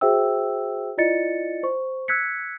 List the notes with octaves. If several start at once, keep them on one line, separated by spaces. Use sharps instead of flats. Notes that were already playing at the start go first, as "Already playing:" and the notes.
F#4 G#4 C5 E5 G5 E6
E4 F4 D5 D#5 A6 C#7
C5 C#6
E6 F#6 G#6 B6 C#7